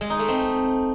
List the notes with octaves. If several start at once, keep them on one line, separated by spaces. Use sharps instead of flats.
G#3
D#4
A3
C4